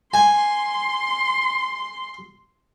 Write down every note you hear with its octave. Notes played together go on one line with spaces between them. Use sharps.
G#5 C6